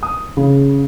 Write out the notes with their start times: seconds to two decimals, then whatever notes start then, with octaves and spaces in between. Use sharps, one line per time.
0.03 D#6
0.37 C#3